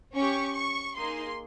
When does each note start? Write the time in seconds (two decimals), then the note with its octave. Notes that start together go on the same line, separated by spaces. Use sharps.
0.15 C#4 G4 C#6
0.55 C#6
0.95 A#3 D#4 G#4 C6